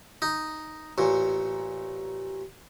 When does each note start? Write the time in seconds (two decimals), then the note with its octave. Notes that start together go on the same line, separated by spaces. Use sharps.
0.22 D#4
0.98 A1 A#2